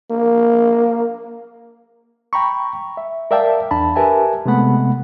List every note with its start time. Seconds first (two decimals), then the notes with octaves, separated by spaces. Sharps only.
0.11 A#3
2.33 G5 A#5 B5 C#6
2.97 E5
3.31 A#4 D5 E5 F5 G5 A5
3.71 E2 D4 A5 B5
3.96 G4 A#4 B4 E5 G#5 A5
4.46 C3 G#3 A3 B3 F#5 B5